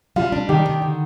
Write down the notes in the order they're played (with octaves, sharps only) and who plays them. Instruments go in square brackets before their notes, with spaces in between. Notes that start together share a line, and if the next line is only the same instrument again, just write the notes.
[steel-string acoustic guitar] G3 [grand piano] F4
[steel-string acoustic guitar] D4
[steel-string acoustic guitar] D#3 [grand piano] G4
[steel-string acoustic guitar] D#3
D3